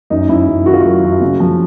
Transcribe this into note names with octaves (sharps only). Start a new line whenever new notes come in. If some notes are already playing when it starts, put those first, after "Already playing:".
F#2 D#4
F#2 E4
F#2
D#3 F#4
F4
F#3 F#4
F#2
C#3
F3